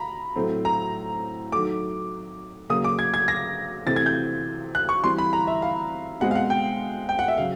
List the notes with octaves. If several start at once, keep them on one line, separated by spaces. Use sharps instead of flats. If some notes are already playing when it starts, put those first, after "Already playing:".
Already playing: A#5 B5
A2 F#3 A3 C4
A#5
D#3 F#3 A3 D6
C#3 F#3 A#3 D#6
D6
G#6
G#6
A#6
C3 E3 A3 C4 A6
G#6
G6
F#6
C#6
E3 G3 C4 C6
B5
A#5
E5
F5
B2 G#3 C4 F#5
F5
F#5
G5
G5
F#5
E5
C#3 F#3 F5